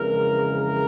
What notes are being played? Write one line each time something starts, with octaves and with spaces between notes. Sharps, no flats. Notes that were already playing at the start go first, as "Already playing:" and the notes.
Already playing: F2 C#3 E3 G#3 A#4
A#4